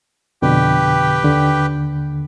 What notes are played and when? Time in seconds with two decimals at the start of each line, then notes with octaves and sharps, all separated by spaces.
0.42 F2 B2 D3 G4 B4 G5
1.23 D#2 D3